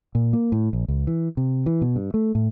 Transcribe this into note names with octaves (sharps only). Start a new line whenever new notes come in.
A#2
A#3
A2
A#1
C#2
E3
C3
E3
B2
G2
A3
A2